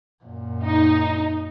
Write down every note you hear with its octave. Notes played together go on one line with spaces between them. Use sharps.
F#2 A#2
D#4